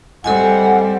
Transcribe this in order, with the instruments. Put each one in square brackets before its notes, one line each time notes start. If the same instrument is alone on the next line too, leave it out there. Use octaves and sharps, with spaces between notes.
[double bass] G3 C4 [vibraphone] A4 D#5 G#5 [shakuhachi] F#5